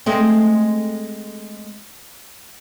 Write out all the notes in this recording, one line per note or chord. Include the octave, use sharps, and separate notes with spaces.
G#3 A3 C4